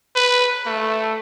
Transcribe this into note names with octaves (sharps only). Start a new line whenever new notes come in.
B4
A3